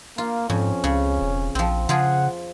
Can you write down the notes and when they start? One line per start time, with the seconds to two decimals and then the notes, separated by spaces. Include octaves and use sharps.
0.18 A#3 F4
0.50 F2 G#2 C#4
0.84 C#2 C#3
1.21 E1
1.55 A#1 F3 C4
1.89 C#3 F3 F4 G#4 F#5